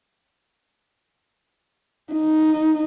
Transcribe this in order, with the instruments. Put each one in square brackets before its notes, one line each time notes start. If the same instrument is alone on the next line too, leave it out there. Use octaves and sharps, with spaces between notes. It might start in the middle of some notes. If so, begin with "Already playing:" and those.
[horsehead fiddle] D#4